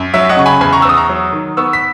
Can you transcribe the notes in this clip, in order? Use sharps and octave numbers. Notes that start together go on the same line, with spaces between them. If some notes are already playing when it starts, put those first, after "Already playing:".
Already playing: F#2
F#3 E5
D#5 F#5
C#3 C#6
G#5 B5
E2 G#5 B5
A#5 C#6
E6
E2 D#6
A#5 C#6
F#3
D#3
B3 C#6 E6
B6